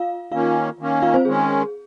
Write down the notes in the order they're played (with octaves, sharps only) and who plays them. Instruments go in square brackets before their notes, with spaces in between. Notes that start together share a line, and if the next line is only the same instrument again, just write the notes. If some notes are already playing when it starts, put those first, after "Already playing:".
Already playing: [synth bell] F4 F5
[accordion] D#3 A#3 C#4 [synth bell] F4 F5
[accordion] D#3 A#3 C#4
[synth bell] F4 F5
C4 C5
[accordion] D#3 G#3 C#4 [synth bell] G#4